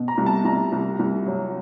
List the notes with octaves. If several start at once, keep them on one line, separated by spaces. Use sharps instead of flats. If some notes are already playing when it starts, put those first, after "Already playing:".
Already playing: B2
A#5
C2
A5
C2 A#5
C2
C2
F#3